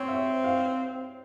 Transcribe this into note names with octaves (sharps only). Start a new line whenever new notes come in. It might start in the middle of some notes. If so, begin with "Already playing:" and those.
Already playing: C4 C5 C#5
E5
F5